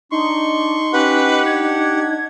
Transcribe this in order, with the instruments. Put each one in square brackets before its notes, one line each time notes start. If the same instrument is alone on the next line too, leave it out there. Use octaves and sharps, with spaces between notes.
[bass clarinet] D4 [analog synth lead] D#4 [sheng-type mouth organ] C6 C#6
[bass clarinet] C#4 [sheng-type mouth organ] G4 F#5 [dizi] B4
[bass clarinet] D4 [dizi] G#6